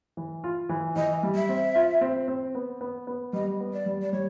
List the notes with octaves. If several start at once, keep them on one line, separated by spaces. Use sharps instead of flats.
E3
F4
E3
E3 D#5
G3
E5
C4
F4
C4
C4
B3
B3
B3
G3 D#5
B3
D5
G3
D5
G3 C#5